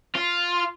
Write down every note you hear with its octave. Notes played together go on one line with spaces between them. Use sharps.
F4